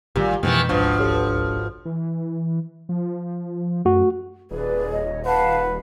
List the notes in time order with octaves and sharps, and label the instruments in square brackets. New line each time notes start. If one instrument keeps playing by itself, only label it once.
[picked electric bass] A1 D#3 G3 [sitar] A#2 [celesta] G4
[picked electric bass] F2 [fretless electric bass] B2 G#3 A#3 [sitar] D#3 E3 B3
[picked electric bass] D1 C#2 D4 [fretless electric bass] G#1 G#2 [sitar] B2 F3 [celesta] C#6
[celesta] G4 A4 C#5
[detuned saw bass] E3
F3
[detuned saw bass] F#2 [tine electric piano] A3 F#4
[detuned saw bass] D#1 [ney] G#4 [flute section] B4 D5
[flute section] C#5 D#5
[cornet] B4 [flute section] F5 A5 [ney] F#5